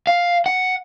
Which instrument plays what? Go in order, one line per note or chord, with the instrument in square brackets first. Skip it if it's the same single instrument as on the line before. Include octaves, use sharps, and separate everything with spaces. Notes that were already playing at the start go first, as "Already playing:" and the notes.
[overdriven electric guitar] F5
F#5